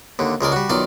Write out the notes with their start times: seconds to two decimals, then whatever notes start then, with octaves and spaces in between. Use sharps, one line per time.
0.19 D#2 D3
0.41 C#2 G#3 A#4 D5
0.52 G3 F#4
0.70 B1 D#3 F4 D5